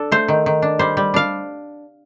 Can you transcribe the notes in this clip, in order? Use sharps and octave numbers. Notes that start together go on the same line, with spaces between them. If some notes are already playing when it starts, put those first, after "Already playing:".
Already playing: D4 A4
A3 C5
D#3
D#3
D4
G3 C5
G3
D4 F5